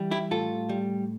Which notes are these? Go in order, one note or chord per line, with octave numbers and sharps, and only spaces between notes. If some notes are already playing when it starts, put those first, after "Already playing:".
Already playing: E3 G3
E4 G4
A2 F4 A4
G3